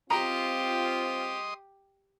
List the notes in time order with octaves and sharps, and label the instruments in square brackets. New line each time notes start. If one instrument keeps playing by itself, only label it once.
[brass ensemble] C4 F4 [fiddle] G4 [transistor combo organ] D#5 C6 D#6 [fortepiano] A#5